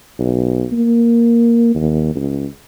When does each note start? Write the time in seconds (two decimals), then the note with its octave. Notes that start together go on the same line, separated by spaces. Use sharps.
0.19 B1
0.72 A#3
1.75 D#2
2.16 C#2